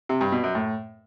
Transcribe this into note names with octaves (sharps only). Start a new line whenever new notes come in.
C3
G2
B2
F#2
A2